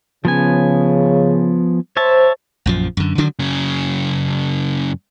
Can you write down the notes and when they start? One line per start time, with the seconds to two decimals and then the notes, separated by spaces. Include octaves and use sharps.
0.25 C#3 F3 B3 G#5
1.97 C5 C#5 E5 A5
2.66 A#1 F#2 F3
2.97 F#2 D3
3.18 D3 D#3 F#3 D4
3.39 F#2 C#3